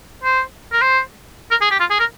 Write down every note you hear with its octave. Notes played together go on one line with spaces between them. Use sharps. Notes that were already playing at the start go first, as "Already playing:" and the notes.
C5
A#4
C5
A#4
G#4
G4
F4
G#4
A#4